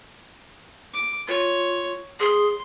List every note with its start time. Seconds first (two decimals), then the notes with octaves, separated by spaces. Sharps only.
0.94 D6
1.28 F4 C#5
2.20 G#4 C6